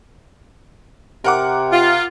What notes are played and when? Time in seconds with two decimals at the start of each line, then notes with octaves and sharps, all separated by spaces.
1.24 C3 A#4 F#5 D6
1.72 F4